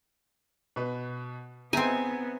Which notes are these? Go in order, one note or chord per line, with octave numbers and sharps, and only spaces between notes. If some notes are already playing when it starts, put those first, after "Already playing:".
B2 B4
B3 C4 D#4 G#4 E5 G#5